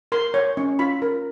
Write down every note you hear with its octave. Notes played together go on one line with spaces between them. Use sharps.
A#4 C6
C#5
C#4
F4 B5
A#4